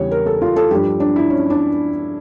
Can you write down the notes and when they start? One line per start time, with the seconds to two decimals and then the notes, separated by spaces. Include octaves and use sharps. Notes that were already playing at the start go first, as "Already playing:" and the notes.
Already playing: E2 C#3 G3 C#5
0.11 A#4
0.26 A4
0.41 F4
0.56 A4
0.71 G2 F3 G4
1.00 D4
1.16 E4
1.30 C#4
1.50 D4